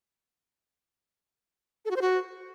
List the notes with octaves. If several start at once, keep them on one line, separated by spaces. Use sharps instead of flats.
A4
F#4
C5
F#4